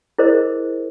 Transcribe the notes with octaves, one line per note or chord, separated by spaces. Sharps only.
E4 G#4 A#4 C5 D#5